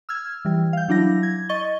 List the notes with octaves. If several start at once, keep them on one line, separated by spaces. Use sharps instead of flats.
E6 F6 G#6
E3 G3
F5 G6
F#3 D4 E4 A#6
G#6
D#5 C#6 A6 G7